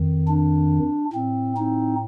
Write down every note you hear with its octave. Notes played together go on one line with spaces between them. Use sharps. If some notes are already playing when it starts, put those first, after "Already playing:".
Already playing: F2 D#3
D4
A2 C4
C4 D#4